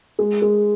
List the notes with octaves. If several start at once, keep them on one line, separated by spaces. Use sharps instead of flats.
G#3
G#3